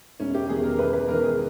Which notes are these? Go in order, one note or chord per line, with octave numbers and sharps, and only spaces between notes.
E1 C#4
G4
E2 D#3 G#4
A#4
E1 B4
B4
E2 D#3 A#4
G#4